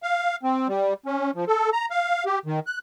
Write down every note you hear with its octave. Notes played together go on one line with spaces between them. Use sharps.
F5
C4
G3
C#4
F3
A4
A#5
F5
G4
D#3
F#6